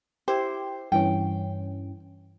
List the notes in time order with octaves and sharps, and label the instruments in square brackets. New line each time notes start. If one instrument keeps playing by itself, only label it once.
[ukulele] E4 C5 [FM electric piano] G4
[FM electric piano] G2 E3 C#4 [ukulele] G5